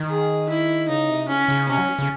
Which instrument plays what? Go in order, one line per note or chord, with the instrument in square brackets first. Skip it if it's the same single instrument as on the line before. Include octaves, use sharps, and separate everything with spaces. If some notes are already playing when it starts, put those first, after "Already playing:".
Already playing: [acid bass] D#3
[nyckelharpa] G#4
E4
[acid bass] C#3 [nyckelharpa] D#4
[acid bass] C3
[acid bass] C#3 [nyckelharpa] C#4
[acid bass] C#3
[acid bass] C3 [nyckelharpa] C#4
[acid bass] F#3
C#3